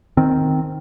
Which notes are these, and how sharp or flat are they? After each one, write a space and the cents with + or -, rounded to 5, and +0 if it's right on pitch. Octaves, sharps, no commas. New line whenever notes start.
D#3 +0 C4 -5